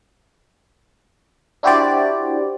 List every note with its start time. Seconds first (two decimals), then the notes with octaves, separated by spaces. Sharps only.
1.63 D4 E4 F#4 G4 C5 D5